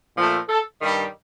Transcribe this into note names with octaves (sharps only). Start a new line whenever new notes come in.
A#2 F3 A3
A4
G2 D#3 G3